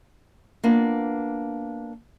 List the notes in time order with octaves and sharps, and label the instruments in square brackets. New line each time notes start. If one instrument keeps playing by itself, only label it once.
[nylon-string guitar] A#3 B3 D4 F4